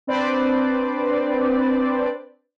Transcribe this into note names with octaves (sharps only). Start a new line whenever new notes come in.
C4 D4 B4 C5 D5